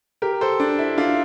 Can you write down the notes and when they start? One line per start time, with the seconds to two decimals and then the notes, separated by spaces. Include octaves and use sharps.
0.22 G4 A#4
0.41 A4 C5
0.60 D4
0.79 E4
0.98 D4 F4